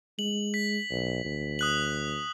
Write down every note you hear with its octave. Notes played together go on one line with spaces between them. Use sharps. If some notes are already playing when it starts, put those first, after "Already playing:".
G#3 F#7
B6
B1
D2
D#6 F#6 F#7